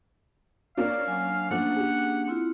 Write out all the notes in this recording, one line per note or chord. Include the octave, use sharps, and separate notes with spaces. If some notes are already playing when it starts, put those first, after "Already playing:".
A#3 C#4 D4 D5 F5
F#3 G#5
F3 A3 A#3 C#4 D4 F#5
G4 G#4
C4 E4 F4